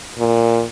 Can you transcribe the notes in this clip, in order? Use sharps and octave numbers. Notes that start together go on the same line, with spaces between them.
A#2